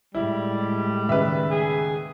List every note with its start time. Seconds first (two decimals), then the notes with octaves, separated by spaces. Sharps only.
0.15 A2 G3 G#3 E4
1.09 D#2 C#3 B4 E5
1.50 G#4